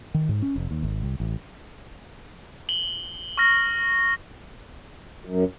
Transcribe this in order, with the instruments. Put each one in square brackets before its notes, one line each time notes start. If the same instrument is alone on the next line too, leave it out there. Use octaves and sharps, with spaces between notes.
[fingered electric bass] D#3
G#2
C#4
F1
D#2
G#1
C2
A1
[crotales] F#7 G7
C#6 F6 A#6
[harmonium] F#2